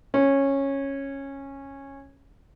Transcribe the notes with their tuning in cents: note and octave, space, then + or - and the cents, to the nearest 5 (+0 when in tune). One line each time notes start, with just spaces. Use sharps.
C#4 -10